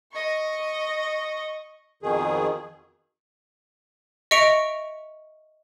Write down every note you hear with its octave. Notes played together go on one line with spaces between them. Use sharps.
D#5 C#6
F2 B2 D#3 G#4
D#5 E5 C#6 C#7 D7 F7